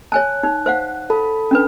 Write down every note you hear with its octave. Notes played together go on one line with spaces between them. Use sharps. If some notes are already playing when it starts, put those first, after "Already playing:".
C#5 G#5 A5 F#6
D#4
C5 F5 F#5
A4 A5 B5
C#4 D4 B4